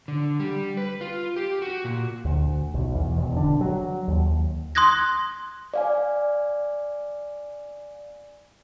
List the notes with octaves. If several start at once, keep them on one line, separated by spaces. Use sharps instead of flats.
D3
G3
B4
F4
G4
F#4
A#2
D2
B1
E2
E1
D3
F#3
D#2
C6 D#6 F#6 G#6 A#6
D5 F5 G#5